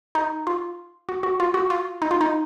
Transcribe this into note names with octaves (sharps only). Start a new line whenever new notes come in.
D#4
F4
F#4
F#4
F4
F#4
F4
D#4
F4
D#4